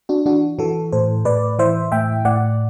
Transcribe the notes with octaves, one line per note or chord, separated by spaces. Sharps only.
D4 F#4
E3 D4 F#4
E3 F#4 A4
A2 A4 C5
A2 B4 D5
E3 C5 E5
A2 E5 G5
A2 D5 F#5